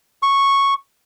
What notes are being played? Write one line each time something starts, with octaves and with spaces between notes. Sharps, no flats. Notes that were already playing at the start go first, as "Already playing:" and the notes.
C#6